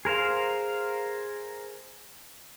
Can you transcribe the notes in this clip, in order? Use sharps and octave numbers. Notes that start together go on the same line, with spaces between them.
G#4 A#4 C5 F5